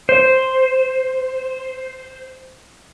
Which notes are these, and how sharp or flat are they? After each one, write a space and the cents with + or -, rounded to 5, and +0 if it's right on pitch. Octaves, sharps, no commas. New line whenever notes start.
C5 +0